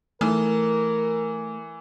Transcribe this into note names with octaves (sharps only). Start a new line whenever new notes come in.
E3 A3 A#4